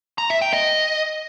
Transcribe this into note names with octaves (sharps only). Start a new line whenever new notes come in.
A#5
E5
G5
D#5